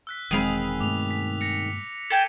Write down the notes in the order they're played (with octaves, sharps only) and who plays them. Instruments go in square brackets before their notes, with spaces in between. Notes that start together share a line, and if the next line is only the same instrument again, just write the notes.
[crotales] E6 F#6 B6
[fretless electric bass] E1 [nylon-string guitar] D#3 G#3 C4 [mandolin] G#4 F5 B5
[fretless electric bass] G2 B2 A3 [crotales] D6 F7
[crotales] B6
A#6 C#7
[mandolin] A4 G5 G#5 [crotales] A#6 B6 D7